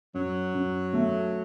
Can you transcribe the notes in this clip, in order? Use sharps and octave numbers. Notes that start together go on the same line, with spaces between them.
F#2 F#3
F#2
A3